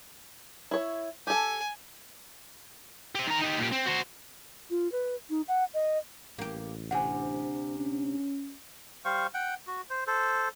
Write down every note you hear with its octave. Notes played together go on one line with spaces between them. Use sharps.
E4 C#5
G4 A4 G#5
C4 G4
D#3 A#5
D#4 G4
A#2 G4
C4
F#4 C5
F4
B4
D#4
F#5
D#5
A1 A#3 G4
D2 C3 F#5 G#5
C#4
G3 C5 F5 C#6
F#5 G5
F#4
C5
A4 C5